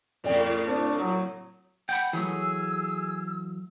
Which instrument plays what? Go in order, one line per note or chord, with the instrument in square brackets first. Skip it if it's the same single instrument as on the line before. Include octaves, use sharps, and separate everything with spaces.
[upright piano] F2 D5 G5 [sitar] A2 C#3
[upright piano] C4 [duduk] D4
[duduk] F#3
[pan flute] F#5 [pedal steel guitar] G5 B5
[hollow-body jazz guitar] E3 F#3 A3 [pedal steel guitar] G#4 [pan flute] E6